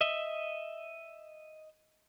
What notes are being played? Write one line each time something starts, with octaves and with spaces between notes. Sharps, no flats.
D#5 E5